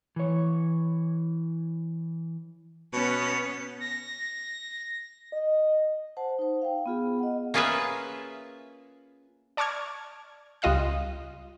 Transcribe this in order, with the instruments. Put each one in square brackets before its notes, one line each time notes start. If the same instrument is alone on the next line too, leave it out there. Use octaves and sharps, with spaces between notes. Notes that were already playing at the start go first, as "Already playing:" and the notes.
[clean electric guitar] E3 C#5
[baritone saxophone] B2 [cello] B3 C#4
[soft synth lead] A#6
[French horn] D#5
[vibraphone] C5 F#5 A5
D#4 C5
F5 G5
B3 F4 G#4
D#5 F#5
[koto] A#3 C#4 F4 G#4 B4 E5
[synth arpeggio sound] D5 A5 C#6 D6 F6 G#6
C#2 G3 F4 D#5 F5 F#6